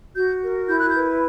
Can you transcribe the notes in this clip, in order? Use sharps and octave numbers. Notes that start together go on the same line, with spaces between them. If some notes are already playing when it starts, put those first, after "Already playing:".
F#4 G6
A#4
E4 G6
F#6
G6
B4